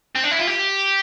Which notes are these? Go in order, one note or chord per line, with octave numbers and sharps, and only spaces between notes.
C4
D4
E4
F4
G4